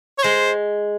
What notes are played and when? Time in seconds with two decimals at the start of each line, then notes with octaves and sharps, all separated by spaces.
0.18 C#5
0.23 G#3 C5